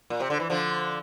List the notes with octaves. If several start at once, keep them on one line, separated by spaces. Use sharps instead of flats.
A#2
C3
D3
E3
D3 F3